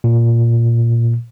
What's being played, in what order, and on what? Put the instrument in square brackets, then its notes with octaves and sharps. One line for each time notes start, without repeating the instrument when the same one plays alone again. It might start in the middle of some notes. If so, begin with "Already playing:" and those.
[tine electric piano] A#2